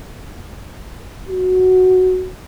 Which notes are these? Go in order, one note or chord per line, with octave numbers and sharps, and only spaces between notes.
F#4